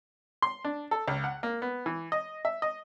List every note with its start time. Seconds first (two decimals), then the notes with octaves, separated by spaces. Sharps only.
0.42 C6
0.65 D4
0.91 A4
1.08 C#2
1.24 F#5
1.43 A#3
1.62 B3
1.86 E3
2.12 D#5
2.45 E5
2.62 D#5